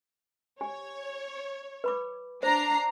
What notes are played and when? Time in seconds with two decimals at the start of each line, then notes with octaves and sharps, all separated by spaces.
0.61 G4 C#5 G#5
1.84 B4 B5 D6
2.43 D4 C5 A#5 C7